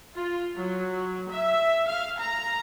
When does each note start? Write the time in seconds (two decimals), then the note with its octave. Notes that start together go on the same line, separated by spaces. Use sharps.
0.14 F4
0.57 F#3
1.31 E5
1.88 F5
2.20 A#5